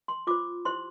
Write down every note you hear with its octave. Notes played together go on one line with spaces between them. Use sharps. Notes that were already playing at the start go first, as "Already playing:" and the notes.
C6
F4 C5 D6
E4 G4 C5 C6